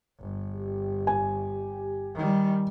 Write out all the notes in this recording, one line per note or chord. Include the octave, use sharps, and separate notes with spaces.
G1
G4
G#5
D#3 G3